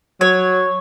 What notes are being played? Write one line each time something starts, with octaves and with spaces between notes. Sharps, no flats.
F#3 C#5